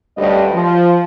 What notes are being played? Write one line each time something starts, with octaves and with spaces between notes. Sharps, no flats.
D2 G2 G3 C#4 D#5
F3